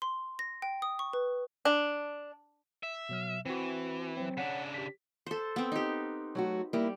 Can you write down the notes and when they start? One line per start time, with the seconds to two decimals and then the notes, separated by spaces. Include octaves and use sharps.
0.02 C6
0.39 A#6
0.62 G5
0.82 D#6
0.99 C#6
1.13 B4
1.65 D4
2.83 E5
3.09 B2 F#3 F6
3.46 E3 C4 F#4
4.17 F#3 C4
4.37 C#3 D4 C#5 F#5 B6
4.74 G4 B6
5.26 A4 C5
5.56 B3 C4
5.72 D#4 G4
6.35 F#3 A3 F#4
6.73 G3 A#3 E4